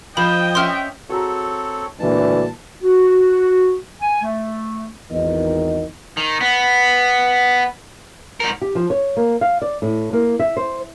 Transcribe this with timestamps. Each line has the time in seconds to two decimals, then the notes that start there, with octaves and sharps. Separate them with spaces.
0.17 F3 D#5 G5 B5
0.55 C#4 E5 C6 F6
1.09 C4 F#4 G#4 A4 C#5 A#5
2.00 D2 A#2 E3 G#3 D4 A5
2.83 F#4
4.02 G#5
4.22 A3
5.11 G#1 E2 D#3 D#5
6.17 D#3
6.41 B3
8.40 G#2 A#4
8.62 G4
8.75 F3
8.90 C#5
9.17 A#3
9.41 F5
9.62 D5
9.82 A2
10.13 A#3
10.39 E5
10.57 C5